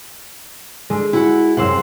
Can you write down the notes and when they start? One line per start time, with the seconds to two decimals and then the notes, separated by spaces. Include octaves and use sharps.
0.90 D3 G#3
1.13 E4 F#4 F#5
1.57 F#2 C3 F#5 C6 E6